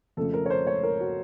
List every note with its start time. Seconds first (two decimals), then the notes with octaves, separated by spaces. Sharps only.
0.17 F2 C#3 A3 A4
0.34 A#4
0.46 C#5
0.50 C5
0.67 C#5
0.83 A#4
1.00 F#4